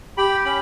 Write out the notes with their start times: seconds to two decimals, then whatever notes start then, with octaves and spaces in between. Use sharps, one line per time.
0.17 G4 G5 B5
0.45 C#4 G5 B5